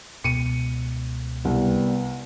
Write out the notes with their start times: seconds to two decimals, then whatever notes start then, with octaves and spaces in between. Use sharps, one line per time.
0.24 C#2 B2 C#7 D#7
1.45 C2 G3 B3